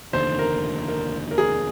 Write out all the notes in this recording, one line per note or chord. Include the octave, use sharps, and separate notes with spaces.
F1 D#2 D3 C5
A#4
A#4
A#4
G#4